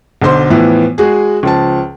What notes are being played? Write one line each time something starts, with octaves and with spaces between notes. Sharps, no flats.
B1 D3 C5 C6
A2 E3 F3 B3
G#3 F#4 G#4
C#2 F3 A5